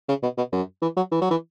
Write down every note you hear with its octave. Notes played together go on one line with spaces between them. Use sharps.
C#3
B2
B2
F#2
E3
F#3
E3
F#3
E3